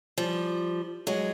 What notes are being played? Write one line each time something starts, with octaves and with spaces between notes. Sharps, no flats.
F3 G3
F#3 G#3